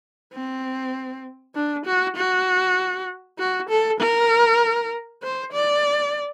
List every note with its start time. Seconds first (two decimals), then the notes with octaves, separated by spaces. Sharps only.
0.34 C4
1.55 D4
1.86 F#4
2.17 F#4
3.39 F#4
3.69 A4
4.00 A#4
5.23 C5
5.53 D5